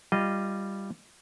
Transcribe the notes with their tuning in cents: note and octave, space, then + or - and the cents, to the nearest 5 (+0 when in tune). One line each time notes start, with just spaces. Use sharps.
G3 +5 F4 -10 D#5 -10